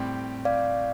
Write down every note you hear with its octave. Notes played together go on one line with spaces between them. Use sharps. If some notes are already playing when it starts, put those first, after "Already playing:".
Already playing: A2 G3 C4 G4
D5 F5